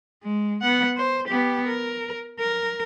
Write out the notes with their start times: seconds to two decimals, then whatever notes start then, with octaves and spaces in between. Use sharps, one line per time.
0.23 G#3
0.61 B3 F#5
0.97 C5
1.28 B3 G4
1.67 A#4
2.39 A#4